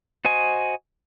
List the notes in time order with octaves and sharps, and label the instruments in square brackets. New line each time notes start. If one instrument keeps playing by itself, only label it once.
[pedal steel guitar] F#4 C5 D#5 G#5